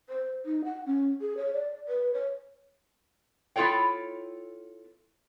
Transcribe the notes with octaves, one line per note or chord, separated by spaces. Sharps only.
C5
D#4
F#5
C#4
G#4
C#5
D5
B4
C#5
B3 E4 F4 A4 C#5 G5